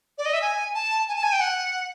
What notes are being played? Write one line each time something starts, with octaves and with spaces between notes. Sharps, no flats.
D5
D#5
E5
G#5
A5
G#5
A5
G#5
G5
F#5